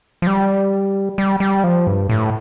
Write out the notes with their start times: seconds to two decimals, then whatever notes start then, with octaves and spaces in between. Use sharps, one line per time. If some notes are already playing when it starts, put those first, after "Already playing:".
0.22 F3
0.27 G3
1.18 G3
1.40 G3
1.64 F3
1.87 G2
2.09 A2